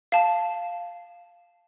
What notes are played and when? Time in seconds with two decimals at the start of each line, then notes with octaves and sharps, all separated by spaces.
0.12 F5 A5